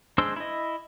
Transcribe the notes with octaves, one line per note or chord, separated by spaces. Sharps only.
G#3 D4 C5 C6 E6
E4 D#5